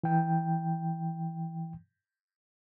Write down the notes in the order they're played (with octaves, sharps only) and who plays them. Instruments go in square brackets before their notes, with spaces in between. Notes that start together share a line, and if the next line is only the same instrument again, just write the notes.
[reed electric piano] E3 G5